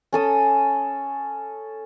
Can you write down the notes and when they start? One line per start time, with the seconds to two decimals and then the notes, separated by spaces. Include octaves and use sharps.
0.13 C#4 A4 D#6